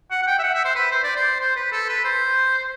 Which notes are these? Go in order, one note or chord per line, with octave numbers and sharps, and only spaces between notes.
F#5
F#5
G5
E5
F#5
E5
C5
B4
C5
D5
C5
C5
B4
A4
B4
C5